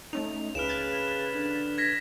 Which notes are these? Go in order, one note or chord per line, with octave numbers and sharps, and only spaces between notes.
A3 C#4 D#4 F7
C#2 C#3 B4 F6 D7 E7
F#6 G#6 A6
D3
G#6 A#6 B6